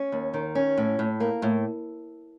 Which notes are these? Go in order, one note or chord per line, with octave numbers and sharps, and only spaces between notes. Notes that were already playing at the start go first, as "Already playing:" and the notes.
Already playing: C#4
D#2
D#3
C#4
A2
A2
A#3
A2